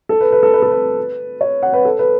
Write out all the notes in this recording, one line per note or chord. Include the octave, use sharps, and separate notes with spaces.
A4
B4
B4
A4
B4
A4
B4
C#5
F#5
B4
A4
B4